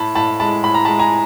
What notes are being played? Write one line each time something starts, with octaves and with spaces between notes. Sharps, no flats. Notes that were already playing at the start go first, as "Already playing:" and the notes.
Already playing: A2 A5 B5
A2 A5 B5
G#3 A5 B5
A2 B5
A#5
G#3 A5 B5
G#5 A#5